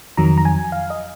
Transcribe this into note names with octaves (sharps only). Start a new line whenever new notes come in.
F2 D#3 F#3 A#5
A#5
G#5
F5
D#5